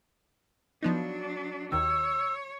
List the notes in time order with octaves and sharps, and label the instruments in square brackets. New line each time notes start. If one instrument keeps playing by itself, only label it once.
[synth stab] F3 B3 D#4 [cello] F#3 D4
[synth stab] D#2 D#3 [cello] C#5 [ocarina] E6